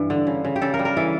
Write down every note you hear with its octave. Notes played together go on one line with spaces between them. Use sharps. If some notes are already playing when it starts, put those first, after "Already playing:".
Already playing: G2 E3
D3
C#3
C#3
G4
C#3 A4
A#4
G3
A#4
E3 A4